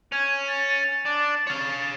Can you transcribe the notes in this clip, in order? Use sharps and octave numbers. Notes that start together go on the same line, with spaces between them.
C#4 G#6
A6
D4
C#5 F5